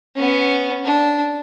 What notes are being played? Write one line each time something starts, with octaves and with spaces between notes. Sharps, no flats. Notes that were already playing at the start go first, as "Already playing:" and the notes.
B3 C#4
D4